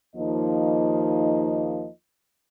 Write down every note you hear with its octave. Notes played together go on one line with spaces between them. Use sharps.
D#2 F3 A#3 D#4 D#5